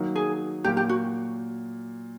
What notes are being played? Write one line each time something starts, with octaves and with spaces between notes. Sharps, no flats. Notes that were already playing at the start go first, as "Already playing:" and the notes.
Already playing: D#3 F#3 A#3 D#4
G#4
A#2 F#3 A#3 G4
G4
F#4